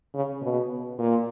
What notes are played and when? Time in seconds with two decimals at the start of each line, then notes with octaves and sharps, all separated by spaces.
0.14 C#3
0.42 B2
0.99 A#2